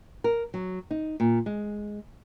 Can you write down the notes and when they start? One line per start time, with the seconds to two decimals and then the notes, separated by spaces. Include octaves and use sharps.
0.24 A#4
0.54 F#3
0.91 D#4
1.20 A#2
1.46 G#3